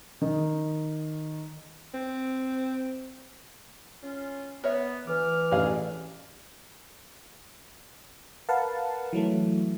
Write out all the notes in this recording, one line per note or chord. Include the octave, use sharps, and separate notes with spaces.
D#3
C4
C#4 F4
B3 A#4 C#5 E5
D2 E3 D6 F6
A1 D4 G#4 F5
A#4 B4 F5 F#5 A5
E3 F#3 A3